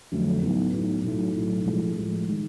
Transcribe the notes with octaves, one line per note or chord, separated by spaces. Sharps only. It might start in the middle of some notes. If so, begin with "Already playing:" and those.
F2 D3 F#3 A3
A2 F#3 B3 D#4
A2 F#3 B3 D#4
B1 A2 F#3
B1 A2 F#3
A2 F3 G#3
A2 F3 G#3
D#3 G#3